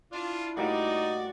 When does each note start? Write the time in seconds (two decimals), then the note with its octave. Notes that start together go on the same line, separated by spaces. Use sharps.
0.12 D4 E4 F4
0.57 A2 G3 A#3 D#4 F#4 D5